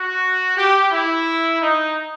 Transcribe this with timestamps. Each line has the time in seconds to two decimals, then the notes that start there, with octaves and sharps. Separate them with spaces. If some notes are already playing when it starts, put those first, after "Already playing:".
Already playing: F#4
0.56 G4
0.91 E4
1.61 D#4